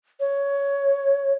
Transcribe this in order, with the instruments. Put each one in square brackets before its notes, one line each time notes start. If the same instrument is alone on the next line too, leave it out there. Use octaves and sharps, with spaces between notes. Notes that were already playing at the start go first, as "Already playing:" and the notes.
[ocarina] C#5